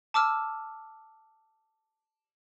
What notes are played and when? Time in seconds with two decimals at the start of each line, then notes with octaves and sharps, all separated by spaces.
0.14 A5 D6 E6 F6